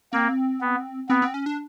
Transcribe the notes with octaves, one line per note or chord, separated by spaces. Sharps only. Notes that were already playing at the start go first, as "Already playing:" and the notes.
A#3 C4
B3
B3 C4
C4
C#4
D4